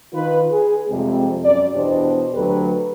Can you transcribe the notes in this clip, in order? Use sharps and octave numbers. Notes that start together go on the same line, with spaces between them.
D#3 F4 B4
G#4
F2 C3 G3 G#3 C4
F#2 D5
E2 B2 D4 G4 C5 D#5
D2 F#3 G4 A4 B4